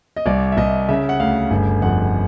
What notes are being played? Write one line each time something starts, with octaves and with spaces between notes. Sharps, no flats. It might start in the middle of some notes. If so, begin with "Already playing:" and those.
D#5
C2 D5
E5
C2 D#5
C#3 E5
F#5
D2 F5
G1
F2 F#5